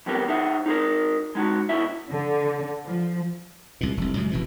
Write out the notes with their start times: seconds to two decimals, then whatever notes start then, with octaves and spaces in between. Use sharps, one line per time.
0.06 F2 C3 G3 B3 G4 A#4
0.28 D#4 G#4 E5 F#5
0.66 D#4 G#4 A#4
1.35 G#3 D#4 F#4
1.69 B2 D3 E4 E5
2.10 D3
2.85 F3
3.81 C2 A#2
3.97 F1 C2
4.16 F#2 C#3 G#3
4.32 F1 B2 E3